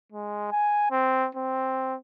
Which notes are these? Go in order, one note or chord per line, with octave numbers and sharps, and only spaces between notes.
G#3
G#5
C4
C4